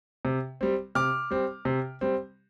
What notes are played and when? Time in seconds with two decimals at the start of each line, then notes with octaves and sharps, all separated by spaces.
0.25 C3
0.61 G3 C4
0.95 C3 D6 F6
1.31 G3 C4
1.65 C3
2.01 G3 C4